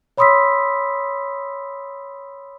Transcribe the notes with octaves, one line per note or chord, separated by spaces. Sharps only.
C#5 B5 C6 D#6 E6 B6